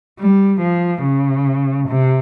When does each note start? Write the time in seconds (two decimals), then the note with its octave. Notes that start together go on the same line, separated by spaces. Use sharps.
0.19 G3
0.61 F3
1.03 C#3
1.88 C3